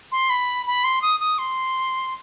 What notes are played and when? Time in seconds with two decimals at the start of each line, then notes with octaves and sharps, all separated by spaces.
0.12 C6
0.30 B5
0.66 B5
0.84 C6
1.02 D#6
1.20 D#6
1.38 C6